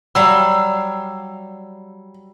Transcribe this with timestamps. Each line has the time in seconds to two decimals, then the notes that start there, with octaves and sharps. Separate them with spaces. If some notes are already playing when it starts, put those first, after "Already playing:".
0.15 F#3 G3 F5 E6